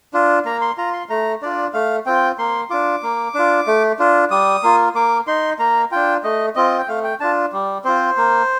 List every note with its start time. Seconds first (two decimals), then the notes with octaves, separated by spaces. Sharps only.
0.13 D4 F4
0.45 A#3 A#5
0.61 C6
0.77 F4 A#5
0.93 C6
1.09 A3 A#5
1.42 D4 F4 D5
1.74 A3 F5
2.06 C4 F4 G5
2.38 A#3 C6
2.70 D4 F4 D6
3.03 A#3
3.34 D4 F4
3.67 A3
3.99 D4 F4
4.31 G3 D#6
4.63 A#3 F4
4.95 A#3 D6
5.27 D#4 C6
5.59 A#3 A#5
5.91 D4 F4 G5
6.24 A3 D#5
6.55 C4 F4 D#5
6.78 G5
6.88 A3 F5
7.04 G5
7.20 D4 F4 A5
7.53 G3
7.84 C4 F4 C5
8.17 A#3